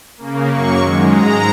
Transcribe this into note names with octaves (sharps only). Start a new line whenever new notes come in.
C#3 A#3
F#2 F#3 A#3 C#6
F#2 D#3 G#3
G#2 G#3 A#5